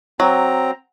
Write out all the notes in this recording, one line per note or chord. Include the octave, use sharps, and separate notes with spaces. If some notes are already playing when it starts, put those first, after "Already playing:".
F#3 C4 A#5